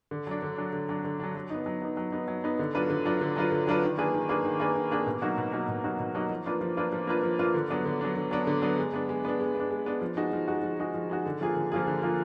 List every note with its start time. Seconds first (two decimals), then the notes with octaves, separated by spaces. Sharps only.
0.11 D3
0.27 F#3 D4
0.42 D3
0.58 F#3 D4
0.73 D3
0.89 F#3 D4
1.04 D3
1.20 F#3 D4
1.35 F#3
1.50 B3 D#4
1.66 F#3
1.82 B3 D#4
1.97 F#3
2.12 B3 D#4
2.28 F#3
2.44 B3 D#4
2.59 D3
2.75 F#3 D4 F4 B4
2.90 D3
3.05 F#3 D4 F4 B4
3.21 D3
3.36 F#3 D4 F4 B4
3.52 D3
3.67 F#3 D4 F4 B4
3.83 D#3
3.98 A#3 D4 G#4 B4
4.14 D#3
4.29 A#3 D4 G#4 B4
4.45 D#3
4.60 A#3 D4 G#4 B4
4.76 D#3
4.91 A#3 D4 G#4 B4
5.07 B2
5.22 F#3 A#3 D#4 F#4
5.38 B2
5.53 F#3 A#3 D#4 F#4
5.68 B2
5.84 F#3 A#3 D#4 F#4
6.00 B2
6.15 F#3 A#3 D#4 F#4
6.30 F3
6.46 A#3 D4 F4 B4
6.61 F3
6.77 A#3 D4 F4 B4
6.92 F3
7.07 A#3 D4 F4 B4
7.23 F3
7.39 A#3 D4 F4 B4
7.54 D3
7.70 F#3 B3 D4
7.85 D3
8.01 F#3 B3 D4
8.16 D3
8.31 F#3 B3 D4
8.47 D3
8.62 F#3 B3 D4
8.78 G#3
8.94 B3 D4
9.09 G#3
9.25 B3 D4
9.40 G#3
9.55 B3
9.60 D4
9.71 G#3
9.86 B3 D4
10.01 F3
10.17 G#3 D#4 F#4
10.33 F3
10.48 G#3 D#4 F#4
10.63 F3
10.79 G#3 D#4 F#4
10.94 F3
11.10 G#3 D#4 F#4
11.26 D3
11.41 F3 A#3 F4 G#4
11.56 D3
11.72 F3 A#3 F4 G#4
11.87 D3
12.02 F3 A#3 F4 G#4